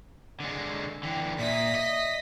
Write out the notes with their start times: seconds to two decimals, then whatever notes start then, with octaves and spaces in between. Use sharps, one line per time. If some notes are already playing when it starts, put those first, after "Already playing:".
0.40 D3 G#3
1.03 D3 E3 G5
1.39 A#2 D5 E5 D#6 A#6 B6
1.75 D#5